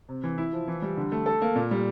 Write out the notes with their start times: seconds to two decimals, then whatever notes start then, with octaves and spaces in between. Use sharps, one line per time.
0.09 C3
0.24 E3
0.38 E4
0.53 F3
0.68 E3
0.82 G3
0.97 D3
1.12 A3
1.26 A4
1.42 A#3
1.56 A#2
1.71 G3